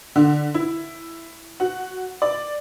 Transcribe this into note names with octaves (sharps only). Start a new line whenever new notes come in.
D3
E4
F#4
D5